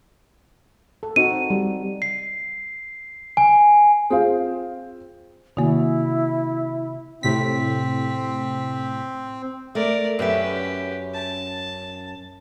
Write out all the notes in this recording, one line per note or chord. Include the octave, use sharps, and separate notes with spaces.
A4
C4 D#4 F#4 D#7
G3
C7
G#5
C4 F4 G#4 C5 F5
C3 D#3 A#3 E4 F#4
A2 C3 C4 B6
A3 A#4 D5
F#2 C#4 G4 B4 E5
A5